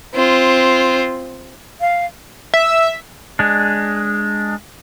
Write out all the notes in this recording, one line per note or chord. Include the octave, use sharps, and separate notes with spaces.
C4 F4
F5
E5
G#3 D4